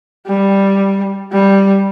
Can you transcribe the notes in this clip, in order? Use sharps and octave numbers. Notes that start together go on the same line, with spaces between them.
G3
G3